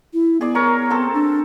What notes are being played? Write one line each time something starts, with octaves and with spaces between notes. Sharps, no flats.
E4
B3 G#4 D5
A#4 C#5 A#5
C4 A4 A5
D4